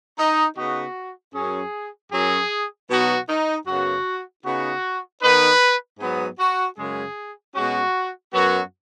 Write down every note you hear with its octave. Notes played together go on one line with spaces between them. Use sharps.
D#4
C#3 B3 D#4 F#4
F#2 F#3 C#4 G#4
F#2 F#3 C#4 G#4
B2 F#3 B3 D#4 F#4
D#4
F#2 C#3 B3 F#4
C#3 B3 D#4 F#4
D#3 B3 D#4 B4
G#2 F#3 B3
F#4
F#2 C#3 G#3 C#4 G#4
B2 G#3 C#4 F#4
F#2 F#3 B3 F#4